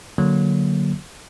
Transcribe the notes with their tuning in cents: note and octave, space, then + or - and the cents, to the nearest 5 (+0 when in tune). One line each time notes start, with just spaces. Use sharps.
D3 +0 F#3 +0 A#3 +5